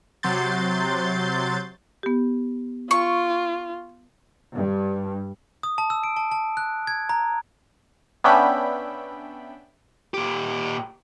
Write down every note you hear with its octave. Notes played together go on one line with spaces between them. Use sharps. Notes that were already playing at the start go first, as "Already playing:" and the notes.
C3 F#3 C6 G6 A6
B3 G4
F4 C#6
G2
D#6
A5
E6
D7
A5
A5
F#6
G#6
A#5
B3 C#4 D4 E5 G5 B5
A#2 G4